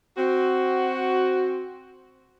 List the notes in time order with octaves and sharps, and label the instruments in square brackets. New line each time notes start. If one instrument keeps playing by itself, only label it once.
[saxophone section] C4 F#4